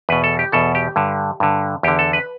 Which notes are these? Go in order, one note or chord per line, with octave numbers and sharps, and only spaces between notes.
E2 B2 B4
A4
G4
E2 B2 A4
G4
G2 D3
G2 D3
E2 D3 G4
A4
B4